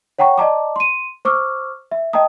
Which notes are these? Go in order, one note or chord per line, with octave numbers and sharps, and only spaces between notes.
C#5 F#5 G5 A#5 C#6
D5 D#5 A5 A#5 D6
C6 D#7
C5 C#6 D6 E6 F6
E5
D#5 G5 A5 A#5 D#6